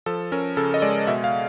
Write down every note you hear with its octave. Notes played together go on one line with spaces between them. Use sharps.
F3 A4
C#4 A#4
C#3 A4
D#5
G#3 D5
B2 E5
F5